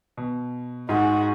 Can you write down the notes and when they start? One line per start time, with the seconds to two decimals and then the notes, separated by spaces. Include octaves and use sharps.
0.17 B2
0.89 G#2 G#3 F#4